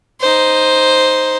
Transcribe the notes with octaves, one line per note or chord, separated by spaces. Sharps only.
D#4 C5